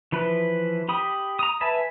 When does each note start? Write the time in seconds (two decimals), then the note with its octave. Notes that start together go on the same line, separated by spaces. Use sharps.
0.12 E3 F3 B4
0.89 G4 B5 D#6
1.39 A#5 D#6
1.61 B4 E5 G#5 A5 B5